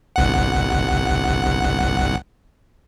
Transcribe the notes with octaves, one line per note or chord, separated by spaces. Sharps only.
G1 C2 F#5